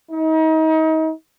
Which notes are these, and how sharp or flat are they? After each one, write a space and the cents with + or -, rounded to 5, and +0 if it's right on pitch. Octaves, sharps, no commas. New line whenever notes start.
D#4 +35